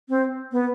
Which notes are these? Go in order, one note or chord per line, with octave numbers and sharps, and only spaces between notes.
C4
B3